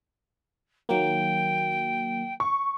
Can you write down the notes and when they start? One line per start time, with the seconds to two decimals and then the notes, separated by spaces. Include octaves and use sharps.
0.89 D#3 F#3 A#3 G5
2.40 C#6